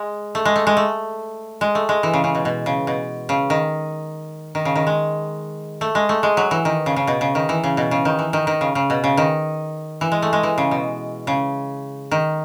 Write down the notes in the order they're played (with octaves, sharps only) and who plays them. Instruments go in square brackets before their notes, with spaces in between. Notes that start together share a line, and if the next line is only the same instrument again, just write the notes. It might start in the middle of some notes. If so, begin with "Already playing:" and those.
Already playing: [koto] G#3
A3
G#3
A3
G#3
A3
G#3
A3
G#3
E3
C#3
C#3
B2
B2
C#3
B2
C#3
D#3
D#3
C#3
D#3
G#3
A3
G#3
A3
G#3
F#3
E3
D#3
C#3
C#3
B2
C#3
D#3
E3
C#3
B2
C#3
D#3
E3
D#3
D#3
C#3
C#3
B2
C#3
D#3
E3
G#3
A3
G#3
E3
C#3
B2
C#3
D#3